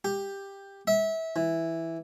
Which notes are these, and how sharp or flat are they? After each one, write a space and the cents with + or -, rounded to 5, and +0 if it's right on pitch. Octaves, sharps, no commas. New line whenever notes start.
G4 +10
E5 -25
E3 -5